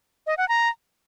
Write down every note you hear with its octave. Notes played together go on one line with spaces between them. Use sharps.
D#5
F#5
A#5